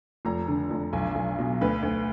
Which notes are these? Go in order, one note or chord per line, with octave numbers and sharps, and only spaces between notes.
F1 A#5
D3
F1
B1 G#5
B1
B2
D2 B4
D2